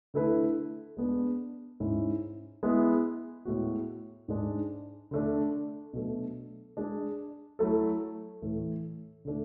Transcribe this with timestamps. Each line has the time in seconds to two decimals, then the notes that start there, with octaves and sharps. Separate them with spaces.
0.14 D3 A3 E4 B4
0.97 G#3 B3 D4
1.80 G#2 G#3 C#4 E4
2.63 G#3 B3 E4
3.45 A2 G#3 B3 F#4
4.28 G#2 G#3 D4
5.11 D3 A3 D4
5.93 B2 F#3 A3 D4
6.77 G#3 D4 G#4 D5
7.59 F#3 A3 E4 A4
8.42 A2 E3 A3
9.25 D3 A3 D4